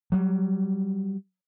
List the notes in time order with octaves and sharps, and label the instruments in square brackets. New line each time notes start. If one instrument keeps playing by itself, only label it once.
[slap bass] F#3 G3